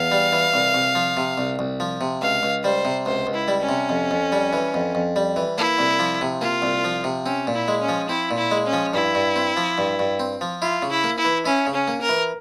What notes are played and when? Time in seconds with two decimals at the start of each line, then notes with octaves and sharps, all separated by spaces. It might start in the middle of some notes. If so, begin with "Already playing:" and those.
Already playing: E2 F5
0.12 G3
0.33 E3
0.54 C2
0.74 C2
0.95 F3
1.17 C3
1.38 C2
1.59 C2
1.80 F3
2.01 C3
2.22 C#2 F5
2.43 C#2
2.64 G3 C5
2.85 C3
3.06 C#2 C5
3.27 C#2
3.34 E4
3.48 G3
3.61 C#4
3.69 C3
3.89 F2
4.11 F2
4.32 G3
4.53 E3
4.74 F2
4.95 F2
5.16 G3
5.36 E3
5.58 A#3 E4
5.79 C2
5.99 F3
6.21 C3
6.41 A#3 F4
6.62 C2
6.84 F3
7.04 C3
7.26 C4 C#4
7.47 A#2
7.54 E4
7.68 G#3
7.82 C#4
7.89 F3
8.09 C4 E4
8.31 A#2
8.37 E4
8.51 G#3
8.66 C#4
8.73 F3
8.94 G2 E4
9.15 G2
9.36 C4
9.57 F3
9.78 G2
9.99 G2
10.20 C4
10.41 F3
10.62 E4 F4
10.82 C#3
10.90 E4
11.04 A#3
11.18 E4
11.25 E3
11.46 C#4 E4
11.67 C#3
11.74 C#4
11.88 A#3
12.01 A#4
12.09 E3